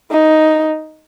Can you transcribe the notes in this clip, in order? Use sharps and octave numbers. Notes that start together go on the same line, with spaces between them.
D#4